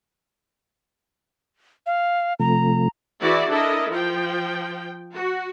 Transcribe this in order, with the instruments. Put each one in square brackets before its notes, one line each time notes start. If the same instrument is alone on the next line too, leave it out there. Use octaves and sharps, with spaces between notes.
[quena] F5
[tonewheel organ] C3 F3 A3 [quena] A#5
[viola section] E3 E4 F#4 G#4 D5
D4 E4 A4 A#4 D#5
F3 G5
F#4